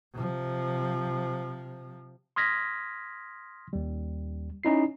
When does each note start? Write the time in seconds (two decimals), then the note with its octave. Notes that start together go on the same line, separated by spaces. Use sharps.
0.13 C3 F3
2.36 C6 D#6 F6 G#6 A#6 B6
3.73 D#2 G3
4.64 C#4 D#4 E4 C7